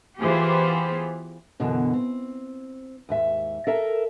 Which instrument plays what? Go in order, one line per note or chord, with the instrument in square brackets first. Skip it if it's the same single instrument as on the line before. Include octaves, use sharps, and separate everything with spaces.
[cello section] E3 B3 F4 G4 G#4 C5
[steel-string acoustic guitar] F#2 B2 D3 E3
C4
D#2 G#2 E5
A4 A#4 E5 A5 A#5